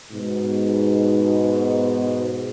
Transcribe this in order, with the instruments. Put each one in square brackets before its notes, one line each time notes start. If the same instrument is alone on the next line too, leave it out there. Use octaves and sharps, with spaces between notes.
[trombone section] G#2 B2